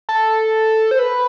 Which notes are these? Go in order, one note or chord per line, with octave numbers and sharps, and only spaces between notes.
A4
C5
B4